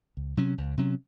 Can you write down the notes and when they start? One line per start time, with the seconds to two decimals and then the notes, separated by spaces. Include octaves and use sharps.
0.17 C#2
0.37 C3 F#3 C#4
0.58 C#2
0.77 C3 F#3 C#4